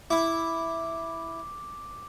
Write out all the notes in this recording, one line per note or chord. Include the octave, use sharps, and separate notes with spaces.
E4 D6